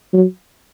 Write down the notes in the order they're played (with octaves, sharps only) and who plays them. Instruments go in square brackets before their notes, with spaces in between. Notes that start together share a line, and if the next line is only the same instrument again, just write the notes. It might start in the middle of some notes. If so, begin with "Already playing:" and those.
[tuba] F#3